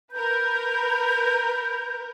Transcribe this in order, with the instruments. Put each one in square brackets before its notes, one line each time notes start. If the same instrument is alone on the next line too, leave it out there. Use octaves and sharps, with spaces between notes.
[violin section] A#4 B4 [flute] G6